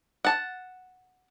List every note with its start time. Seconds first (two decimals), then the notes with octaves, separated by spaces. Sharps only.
0.25 F#5 A5